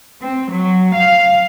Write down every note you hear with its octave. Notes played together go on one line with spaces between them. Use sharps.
C4
F#3
F5